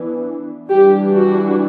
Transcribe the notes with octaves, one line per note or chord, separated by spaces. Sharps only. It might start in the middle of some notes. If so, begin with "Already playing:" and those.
Already playing: E3 B3 D4
E3 G3 D4 G4
F#4